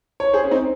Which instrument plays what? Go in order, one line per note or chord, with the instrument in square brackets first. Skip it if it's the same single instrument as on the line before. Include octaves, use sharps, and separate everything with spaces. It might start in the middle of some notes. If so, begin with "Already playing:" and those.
[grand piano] C#5
G#4 C5
C#4
C4 D#4